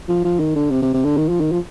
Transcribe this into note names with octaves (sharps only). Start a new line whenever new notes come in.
F3
F3
D#3
D3
C3
C3
C3
D3
D#3
F3
D#3
F3